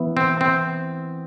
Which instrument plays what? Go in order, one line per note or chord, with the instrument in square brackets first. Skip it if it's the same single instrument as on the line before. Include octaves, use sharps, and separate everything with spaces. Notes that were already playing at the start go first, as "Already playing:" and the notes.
Already playing: [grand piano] E3 B3 E4
[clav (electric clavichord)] C4
C4